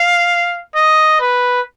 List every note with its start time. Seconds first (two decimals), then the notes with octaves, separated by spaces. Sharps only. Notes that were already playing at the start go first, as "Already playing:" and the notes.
Already playing: F5
0.76 D#5
1.21 B4